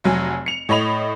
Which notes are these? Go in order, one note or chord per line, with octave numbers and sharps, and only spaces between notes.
F1 F#3 G#5
C#7 F7
A2 C#5 D#5 B5 F7